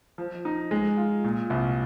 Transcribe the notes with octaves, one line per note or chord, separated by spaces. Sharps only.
F3
D#4
G#3
F4
A#2
C2